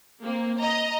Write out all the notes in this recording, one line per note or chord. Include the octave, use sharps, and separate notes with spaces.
A#3 C4
D#5 A#5